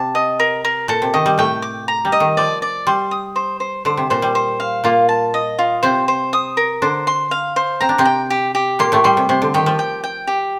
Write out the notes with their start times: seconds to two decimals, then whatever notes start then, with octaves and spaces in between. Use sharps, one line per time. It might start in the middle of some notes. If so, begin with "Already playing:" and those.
Already playing: C3 A5
0.15 D#5
0.40 A#4
0.65 A#4
0.88 A#2 A4
1.02 C3
1.14 D#3 D#5
1.26 G3
1.38 A2 A3 G5
1.62 D6
1.88 A#5
2.05 G3
2.12 D#5
2.20 D#3
2.37 F3 D5
2.62 D5
2.87 G3 C6
3.11 D#6
3.36 C5
3.60 C5
3.85 D3 C5
3.97 C3
4.10 A#2 C5
4.22 G3
4.35 C5
4.60 F5
4.84 A#2 A#3 F4
5.09 A5
5.34 D#5
5.59 F4
5.83 C3 C4 C5
6.08 C5
6.33 D#6
6.57 A#4
6.82 D3 D4 C5
7.07 C6
7.31 F5
7.56 C5
7.81 C4 A#5
7.89 D4
7.98 C3 C4
8.05 G5
8.30 G4
8.55 G4
8.79 A#2 A#3 C6
8.92 A2 A3
9.04 G3 C6
9.17 C3
9.29 C3 C5
9.42 D3
9.54 D#3 G4
9.66 F3
9.79 G5
10.04 G5
10.27 G4